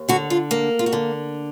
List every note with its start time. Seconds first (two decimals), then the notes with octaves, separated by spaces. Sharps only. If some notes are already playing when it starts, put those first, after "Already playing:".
Already playing: D#2
0.09 D3 F#4
0.30 F4
0.51 A#3
0.79 F4
0.86 F#4
0.93 D3